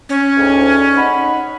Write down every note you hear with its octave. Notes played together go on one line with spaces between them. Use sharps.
C#4
D2 G#2
D#4 F#5 B5